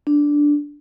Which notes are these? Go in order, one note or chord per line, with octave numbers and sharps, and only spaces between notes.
D4